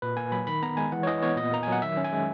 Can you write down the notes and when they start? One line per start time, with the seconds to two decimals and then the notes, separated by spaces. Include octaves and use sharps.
0.02 A#2 B4
0.17 A#3 G#5
0.32 F#3 B5
0.47 D#3 B5
0.63 B3 A#5
0.77 G#3 G#5
0.92 E3 F#5
1.03 C#5
1.07 E3 D#5
1.22 B3 C#5
1.37 A#2 D#5
1.52 A#3 A#5
1.63 F#3 G#5
1.72 F#5
1.82 D#3 E5
1.97 C#4
2.04 G#5
2.12 G#3